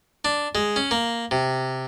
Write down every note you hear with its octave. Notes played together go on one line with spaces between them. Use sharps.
D4
G#3
C#4
A#3
C3